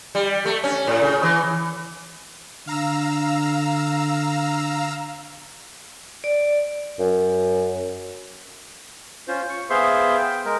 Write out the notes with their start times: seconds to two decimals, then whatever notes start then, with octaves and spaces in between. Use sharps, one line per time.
0.15 G3
0.46 A3
0.64 C#4
0.87 A2
1.01 C#3
1.23 E3
2.67 D3 F5 A#5 E6
6.24 D5
6.99 F#2
9.28 C#4 F4 C5
9.49 C#6
9.70 B3 G#4 C5 E5 F5 C6
10.18 G5
10.45 G#3 A#4